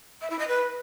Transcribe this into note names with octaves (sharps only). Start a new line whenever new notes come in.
E5
E4
D#5
B4